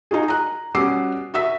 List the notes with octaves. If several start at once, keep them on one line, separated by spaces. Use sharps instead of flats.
D#4 F4 F#4 G#4
A#5 F#6
B2 G3 C#4 D6 E6 C7
F#4 E5 E6 B6